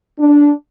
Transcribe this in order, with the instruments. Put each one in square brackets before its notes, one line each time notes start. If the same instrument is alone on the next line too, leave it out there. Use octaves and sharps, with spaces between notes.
[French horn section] D4